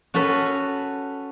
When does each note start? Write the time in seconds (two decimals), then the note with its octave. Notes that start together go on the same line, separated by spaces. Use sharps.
0.14 C#4 F#4 A4 B4